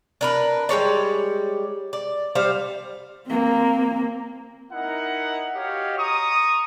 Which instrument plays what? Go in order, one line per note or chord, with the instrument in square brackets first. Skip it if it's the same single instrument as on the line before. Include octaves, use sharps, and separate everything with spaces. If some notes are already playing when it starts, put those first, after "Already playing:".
[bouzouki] D4 A#4 B4
G3 G#3 C#5 D5
D5
G3 C5 F5
[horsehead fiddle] A#3 C4
[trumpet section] D#4 E4 A#4 F#5
F#4 G4 C#5 D#5 F5
A#5 C#6 D#6